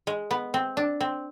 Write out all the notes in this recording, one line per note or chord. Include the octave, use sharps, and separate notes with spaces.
G#3
B3
C4
D4
C4